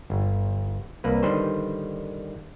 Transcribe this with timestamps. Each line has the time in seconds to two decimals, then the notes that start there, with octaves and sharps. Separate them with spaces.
0.10 G1
1.04 C2 A#3 B4
1.23 D3 D#3 G3 B4 C5